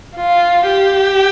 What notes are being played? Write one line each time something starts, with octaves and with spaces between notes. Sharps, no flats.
F4
G4